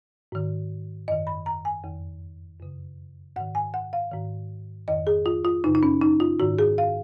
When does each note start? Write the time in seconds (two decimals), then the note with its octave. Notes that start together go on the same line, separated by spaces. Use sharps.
0.32 G#2 D#3
1.08 F#2 D#3 D#5
1.27 B5
1.46 A#5
1.65 G#5
1.84 F2 D#3
2.60 F#2 C#3
3.36 G#2 D#3 F#5
3.55 G#5
3.74 F#5
3.93 F5
4.12 G#2 D#3
4.88 F2 D#3 D#5
5.07 G#4
5.26 F4
5.45 F4
5.64 F#2 C#3 D#4
5.75 D#4
5.83 C#4
6.01 D#4
6.20 F4
6.40 G#2 D#3 F#4
6.59 G#4
6.78 F5